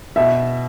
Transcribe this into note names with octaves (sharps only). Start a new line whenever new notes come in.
B2 E5